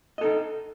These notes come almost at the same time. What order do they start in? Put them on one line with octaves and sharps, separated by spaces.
D#5 A4 D#4